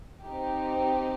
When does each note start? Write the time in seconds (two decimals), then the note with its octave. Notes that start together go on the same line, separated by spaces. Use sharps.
0.24 C4 D#4 G4